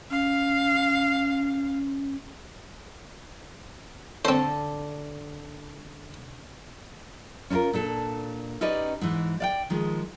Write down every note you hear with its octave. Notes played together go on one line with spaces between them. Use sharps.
C#4 F5
D3 C4 A4 C5
C#4 D4 E4 F4 A#4
A#2 D4 A4
C#4 D#4 G4 B4 D5 D#5
G#2 E3
D5 F5 G5
D#3 F3 G#3